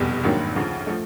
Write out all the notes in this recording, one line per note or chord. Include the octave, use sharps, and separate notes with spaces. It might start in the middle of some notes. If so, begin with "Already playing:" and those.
Already playing: F1 E2 B2 G3
G#1 G2 D#3 F#3 A#3
D2 C#3 F3
F3 A3